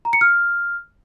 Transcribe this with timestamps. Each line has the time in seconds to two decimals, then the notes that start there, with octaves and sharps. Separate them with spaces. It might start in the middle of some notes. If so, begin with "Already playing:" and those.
0.05 A#5
0.13 C#7
0.21 F6